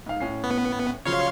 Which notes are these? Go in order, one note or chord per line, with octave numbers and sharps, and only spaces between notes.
G#2 F5
A2 C#4 C7
B3
C#3 F3 F#3 C#5 F5 C6